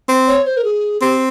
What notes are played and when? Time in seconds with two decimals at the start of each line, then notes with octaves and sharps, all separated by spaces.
0.09 C4
0.27 C#5
0.46 C5
0.57 A#4
0.65 G#4
1.01 C4 G4